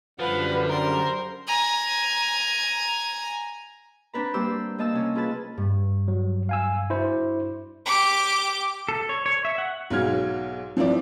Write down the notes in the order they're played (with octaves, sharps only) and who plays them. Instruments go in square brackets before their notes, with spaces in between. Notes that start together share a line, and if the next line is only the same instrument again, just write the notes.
[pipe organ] F#2 D3 G3 [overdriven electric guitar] F3 [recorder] B4 [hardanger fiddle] F5 F#5
[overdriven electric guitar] A#4 [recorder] C5 [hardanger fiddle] C6
[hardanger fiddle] G#5 A#5
[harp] C4 D4 B4 A#5
G3 A#3 G4 C5 D6 E6
A#3 D#5 A5 E6
C3 C#4
F4 G#4 B4 A5
G2
[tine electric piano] F#3
F5 G#5 E6
[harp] D4 F#4 [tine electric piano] E4 C5
[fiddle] G4 D6
[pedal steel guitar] A4
C#5
C#5
E5
F#5
[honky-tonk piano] B1 G#2 F#3 F6 G#6
F3 C4 E4 D5